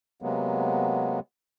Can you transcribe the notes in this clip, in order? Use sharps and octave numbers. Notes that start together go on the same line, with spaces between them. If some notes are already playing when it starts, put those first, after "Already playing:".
C3 F#3 G#3 A#3 B3